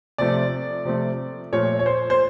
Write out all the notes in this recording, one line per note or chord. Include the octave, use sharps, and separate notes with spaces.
C3 F3 A3 D5
C3 F3 A3
A#2 F3 A3 C#5
C#5
C5
C5